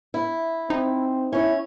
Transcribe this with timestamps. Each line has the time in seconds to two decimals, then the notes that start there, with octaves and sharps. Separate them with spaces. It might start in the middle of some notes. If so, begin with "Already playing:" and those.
0.14 E4
0.70 C4 D#4
1.33 C#4 E4 C#5